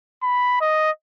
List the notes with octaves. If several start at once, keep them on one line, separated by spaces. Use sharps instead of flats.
B5
D#5